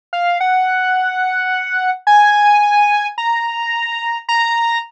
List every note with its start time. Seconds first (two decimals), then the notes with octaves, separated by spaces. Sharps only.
0.13 F5
0.40 F#5
2.07 G#5
3.18 A#5
4.29 A#5